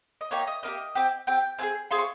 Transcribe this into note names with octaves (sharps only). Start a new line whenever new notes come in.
D#5
A#3 D#4 G4 C#5
D#5
A#3 D#4 G4 D#5
C4 G4
C4 G4 G5
C4 F4 G#4 G#5
C4 F4 G#4 C6
C#6